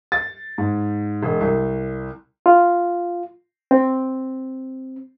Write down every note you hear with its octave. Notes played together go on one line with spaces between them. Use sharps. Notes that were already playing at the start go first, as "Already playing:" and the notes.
A6
G#2
E1
C2
F4
C4